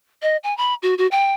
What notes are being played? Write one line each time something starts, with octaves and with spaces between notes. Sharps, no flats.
D#5
G#5
B5
F#4
F#4
G5